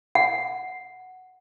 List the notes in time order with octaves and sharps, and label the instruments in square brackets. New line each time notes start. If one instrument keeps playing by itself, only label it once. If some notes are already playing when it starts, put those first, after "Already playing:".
[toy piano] F#5